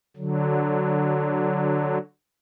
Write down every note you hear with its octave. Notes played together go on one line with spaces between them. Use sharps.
D3 F#3